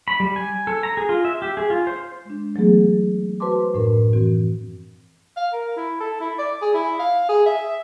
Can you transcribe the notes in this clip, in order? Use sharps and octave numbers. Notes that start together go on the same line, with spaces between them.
B5
G3
G#5
A4
A#5
G#4
F4
E5
G4
G#4
F4
C5
G#3 D4
E3 F#3 A3 B3 G#4
F#4 B4 C5 A5 C6 D6
F#2 A2 F3 D4 A#4
E3 C4 F#4
F5
A#4
E4
A4
E4
D5
G#4
E4
F5
G#4
E5